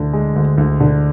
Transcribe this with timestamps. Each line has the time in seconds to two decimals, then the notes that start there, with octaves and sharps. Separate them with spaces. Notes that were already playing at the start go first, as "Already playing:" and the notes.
Already playing: D2 D3
0.13 G#3
0.36 D2
0.58 D2
0.80 D3